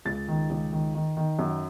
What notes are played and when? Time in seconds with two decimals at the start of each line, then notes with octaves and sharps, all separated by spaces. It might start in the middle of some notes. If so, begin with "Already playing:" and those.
0.05 C#2 A6
0.28 D#3
0.50 C#2
0.72 D#3
0.94 D#3
1.17 D#3
1.39 F#2